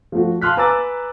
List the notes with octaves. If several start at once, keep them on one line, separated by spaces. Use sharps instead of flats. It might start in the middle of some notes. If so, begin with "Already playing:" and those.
F3 A3 F#4
F5 A5 C6 F6 F#6 B6
B4 G#5 A#5 D6 E6 A6